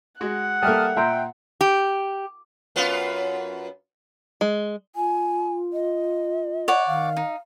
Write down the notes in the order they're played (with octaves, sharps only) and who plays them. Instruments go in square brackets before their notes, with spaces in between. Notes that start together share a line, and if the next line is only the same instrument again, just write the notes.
[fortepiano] G#3 F#4 [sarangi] F#5
[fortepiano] G3 A#3 [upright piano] A4 E5 G5 [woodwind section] A5 D#6 F6
[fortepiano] A#2 [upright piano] E5 A#5 C6 [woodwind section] G5
[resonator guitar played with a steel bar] G4
[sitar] F#2 B3 F4
[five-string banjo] G#3
[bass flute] F4 [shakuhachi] G#5
[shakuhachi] D#5
[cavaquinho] C#5 D5 F#5
[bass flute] D#3 [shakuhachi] F5
[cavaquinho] D#4